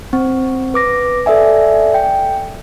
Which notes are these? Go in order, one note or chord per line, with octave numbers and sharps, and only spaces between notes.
C4
B4 D6 A#6
A4 D5 E5 G#5
G5